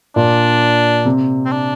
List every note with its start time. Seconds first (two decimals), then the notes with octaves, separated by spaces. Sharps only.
0.16 A#2 D4
1.05 C3
1.45 C4
1.51 D4